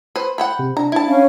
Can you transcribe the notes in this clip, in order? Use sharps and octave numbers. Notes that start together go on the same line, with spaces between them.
B4 C5
F#5 G5 B5
C3
D4 A#5
E4 A5
C#4 F5